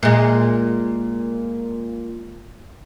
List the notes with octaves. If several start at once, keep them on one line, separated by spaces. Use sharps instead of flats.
A#2 G#3